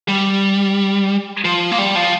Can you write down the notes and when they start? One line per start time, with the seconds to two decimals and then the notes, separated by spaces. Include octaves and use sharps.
0.08 G3
1.45 F3
1.72 A#3
1.78 G3
1.96 F3